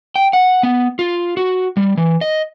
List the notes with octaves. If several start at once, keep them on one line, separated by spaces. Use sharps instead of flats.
G5
F#5
B3
F4
F#4
G3
E3
D#5